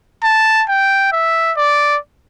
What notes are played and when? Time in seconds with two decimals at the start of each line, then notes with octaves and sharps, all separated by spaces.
0.24 A5
0.68 G5
1.12 E5
1.57 D5